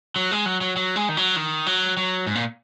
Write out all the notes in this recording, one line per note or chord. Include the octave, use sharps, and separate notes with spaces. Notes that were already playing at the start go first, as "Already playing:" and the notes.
F#3
G#3
F#3
F#3
F#3
G#3
D#3
F#3
D#3
F#3
F#3
G#2
A#2